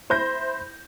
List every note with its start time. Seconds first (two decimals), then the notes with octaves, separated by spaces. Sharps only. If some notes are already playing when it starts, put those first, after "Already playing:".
0.10 E4 C5 B5 G6 A#6